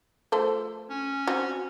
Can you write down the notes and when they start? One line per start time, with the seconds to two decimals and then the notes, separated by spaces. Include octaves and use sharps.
0.32 F3 A3 C5
0.90 C#4
1.27 C4 F#4